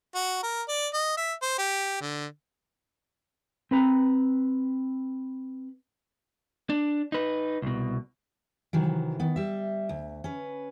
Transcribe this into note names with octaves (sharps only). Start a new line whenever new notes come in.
F#4
A#4
D5
D#5
E5
C5
G4
D3
C4 B4 A#5
D4
D#4 B4
C2 B2
C3 D#3 E3 F#3
D#3 B3
G3 E5
D2
C#4 B4